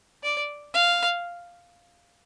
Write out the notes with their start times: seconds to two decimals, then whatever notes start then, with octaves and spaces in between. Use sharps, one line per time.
0.23 D5
0.74 F5